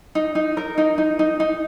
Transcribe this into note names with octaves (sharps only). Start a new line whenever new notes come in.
D#4
D#4
A#4
D#4
D#4
D#4
D#4